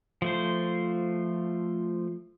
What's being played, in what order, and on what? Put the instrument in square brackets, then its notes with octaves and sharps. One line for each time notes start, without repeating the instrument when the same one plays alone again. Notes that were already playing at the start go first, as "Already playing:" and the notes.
[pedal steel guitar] F3 A3 C5